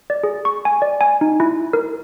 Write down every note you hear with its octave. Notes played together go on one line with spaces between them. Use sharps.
D5
G#4
C#6
G#5
D5
G#5
D#4
E4
A#4